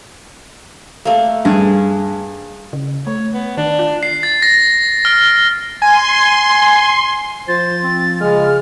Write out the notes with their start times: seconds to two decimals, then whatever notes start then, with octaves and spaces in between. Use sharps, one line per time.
1.05 A3 A#3
1.45 G2 G#4
2.73 C#3
3.07 A3 C#5
3.33 B3
3.57 D#3 D4
3.79 F4
4.03 C7
4.23 A6
4.42 A#6
5.05 F6
5.82 G#5 C6
7.48 F3 C5 A6
7.83 C4
8.21 C#3 G#3 F6